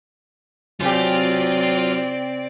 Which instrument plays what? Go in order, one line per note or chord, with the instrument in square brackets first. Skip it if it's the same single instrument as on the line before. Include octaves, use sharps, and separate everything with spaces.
[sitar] C3 G4 [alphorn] F#3 [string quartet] C4 D5 [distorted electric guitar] F4